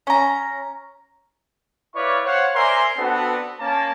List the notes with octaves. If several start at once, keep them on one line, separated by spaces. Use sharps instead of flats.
C#4 A#5
E4 B4 C#5 D5 F5 C#6
C5 C#5 F5 F#5
A#4 C5 D5 E5 G#5 C6
B3 C4 D4 F#4 A4 B4
A#3 C#4 A5